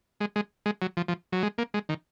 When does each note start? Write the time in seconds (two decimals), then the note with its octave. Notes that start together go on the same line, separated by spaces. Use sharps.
0.20 G#3
0.36 G#3
0.66 G#3
0.82 F#3
0.97 F3
1.08 F3
1.33 F#3
1.43 G#3
1.58 A#3
1.74 G#3
1.89 D#3